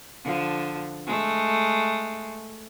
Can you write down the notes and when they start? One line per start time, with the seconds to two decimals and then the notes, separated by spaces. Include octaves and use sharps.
0.24 D3 F3
1.06 G#3 A3